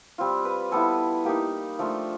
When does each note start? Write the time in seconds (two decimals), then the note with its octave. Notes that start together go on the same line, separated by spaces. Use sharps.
0.18 G3 C4 F4
0.45 B4
0.72 G3 B3 E4 A4
1.25 A#3 D#4 G4
1.79 F3 A3 D4 F4